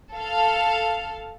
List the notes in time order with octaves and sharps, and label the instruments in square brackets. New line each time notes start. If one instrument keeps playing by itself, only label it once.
[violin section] A4 F5